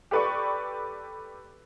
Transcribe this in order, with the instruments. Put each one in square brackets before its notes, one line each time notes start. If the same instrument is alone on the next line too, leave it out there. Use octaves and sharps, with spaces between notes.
[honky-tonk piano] G4 A4 B4 D5 C#6